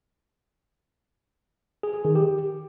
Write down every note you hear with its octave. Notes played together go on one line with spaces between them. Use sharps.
G#4
G#4
D#3
G4